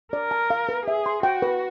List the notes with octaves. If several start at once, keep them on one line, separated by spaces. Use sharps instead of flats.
A#4 D5
A5
F5
B4
G#4 E5
C6
F#4 G5
B4